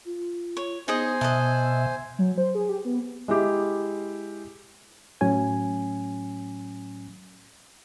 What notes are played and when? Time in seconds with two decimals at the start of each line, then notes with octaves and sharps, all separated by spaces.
0.06 F4
0.57 C#5
0.88 B3 D#4 G#4 C5 D#5 G#5
1.21 B2 D#5 E5 F#5 A5
2.19 F#3
2.38 C5
2.55 G#4
2.69 G4
2.85 B3
3.28 G#3 E4 G4
5.21 A2 F#3 C#4 G#5